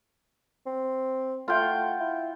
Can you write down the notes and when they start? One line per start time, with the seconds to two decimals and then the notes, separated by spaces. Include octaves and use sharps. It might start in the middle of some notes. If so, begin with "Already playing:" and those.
0.66 C4
1.48 A3 F4 F#5 G5
2.00 E4